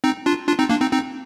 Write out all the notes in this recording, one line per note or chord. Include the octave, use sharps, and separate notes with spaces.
C4 D#4
D4 F4
D4 F4
C4 D#4
A#3 D4
C4 D#4
C4 D#4